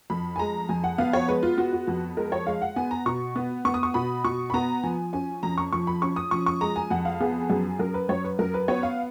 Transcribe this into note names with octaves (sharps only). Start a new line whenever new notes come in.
F2 B5
G#5
G#3 A#5
F2 G#5
F#5
B3 F5
C#5
G#3 B4
F4
B3 F#4
F#4
F2 F#4
G#3 A#4
C#5
G#3 F5
F#5
B3 G#5
A#5
B2 C#6
B3
B3 C#6
D#6
C#6
B2 B5
B2 C#6
B5
B3 A#5
F3 G#5
C#4 G#5
F2 A#5
C#6
F3 C#6
B5
C#4 C#6
D#6
F3 C#6
C#6
G#3 A#5
G#5
F2 F#5
F5
B3 G#4
F#2 G#4
F#2 A#4
B4
F#2 C#5
B4
F#2 A#4
B4
B3 C#5
F5